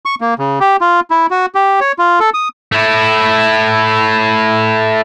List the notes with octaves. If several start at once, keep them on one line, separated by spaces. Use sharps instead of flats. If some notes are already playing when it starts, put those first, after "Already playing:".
C#6
A#3
C#3
G4
F4
E4
F#4
G4
C#5
F4
A4
D#6
A3 E4